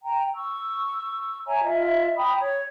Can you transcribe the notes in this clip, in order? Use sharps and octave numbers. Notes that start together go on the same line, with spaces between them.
G5 A#5
C#6 E6
C#5 E5 G#5 A#5
F4 D#5 E5
G5 A#5 B5 D#6
C#5